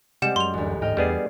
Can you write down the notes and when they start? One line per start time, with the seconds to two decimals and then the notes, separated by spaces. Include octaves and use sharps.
0.22 C3 G3 G#3 G4 F#5 E7
0.36 F#2 C6 F7
0.53 A1 D2
0.82 G#2 D#5 G5 F6
0.97 E2 G3 B3 G#4 D5 G#6 C7